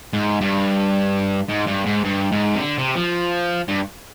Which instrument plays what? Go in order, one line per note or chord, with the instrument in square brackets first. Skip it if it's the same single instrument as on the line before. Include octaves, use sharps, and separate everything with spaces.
[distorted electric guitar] G#2
G2
G#2
G2
G#2
G2
G#2
C3
D3
C3
F3
G2